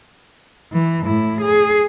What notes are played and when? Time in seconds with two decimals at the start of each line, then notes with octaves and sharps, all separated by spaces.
0.72 E3
1.05 A2 E4
1.41 G#4